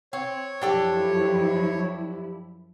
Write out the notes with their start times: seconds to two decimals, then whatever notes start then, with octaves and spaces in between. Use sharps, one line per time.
0.13 C4 C#5
0.62 F#2 F3 D4 E4 G4 A4